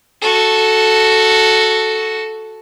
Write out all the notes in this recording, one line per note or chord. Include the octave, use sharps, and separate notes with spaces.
F#4 A4